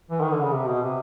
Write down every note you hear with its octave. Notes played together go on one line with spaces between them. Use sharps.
E3
D#3
D3
C#3
C3
B2
C3